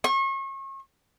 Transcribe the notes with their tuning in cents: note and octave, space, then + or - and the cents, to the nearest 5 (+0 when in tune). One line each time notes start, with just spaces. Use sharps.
C#6 -35